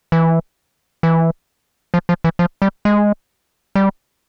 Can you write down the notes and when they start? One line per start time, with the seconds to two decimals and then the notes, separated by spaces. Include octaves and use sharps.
0.12 E3
1.03 E3
1.94 F3
2.09 F3
2.24 E3
2.39 F3
2.62 G3
2.85 G#3
3.75 G3